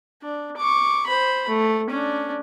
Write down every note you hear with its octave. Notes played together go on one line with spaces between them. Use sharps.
D4
C#6 D6
C5 B5
A3
C#4 D4